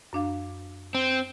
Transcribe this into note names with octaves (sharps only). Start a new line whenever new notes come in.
F#2 D4 F5
C4